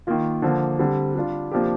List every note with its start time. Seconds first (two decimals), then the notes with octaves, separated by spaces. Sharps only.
0.07 D#3 A#3 F4
0.42 D3 F3 A#3
0.79 D3 G3 C4
1.15 G3 D4 F4
1.51 C3 F3 A#3 D4 G4